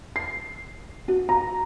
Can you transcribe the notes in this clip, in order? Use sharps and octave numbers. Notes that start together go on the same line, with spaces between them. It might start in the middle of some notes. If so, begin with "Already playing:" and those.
C7
F#4
A#5